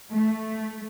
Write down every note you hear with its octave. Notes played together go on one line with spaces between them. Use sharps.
A3